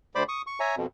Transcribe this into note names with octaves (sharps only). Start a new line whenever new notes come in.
D2 C5 D5 B5 D6
C#6 D#6
C#6
C#5 E5 G#5 A#5
F2 B2